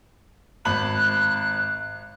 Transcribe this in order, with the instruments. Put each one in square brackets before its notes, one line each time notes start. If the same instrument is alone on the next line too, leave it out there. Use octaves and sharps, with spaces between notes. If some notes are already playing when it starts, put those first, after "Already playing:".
[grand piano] G#1 B5 F#7 [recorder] F#6